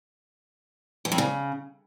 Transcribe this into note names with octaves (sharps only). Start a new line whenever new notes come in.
E2
F2
C#3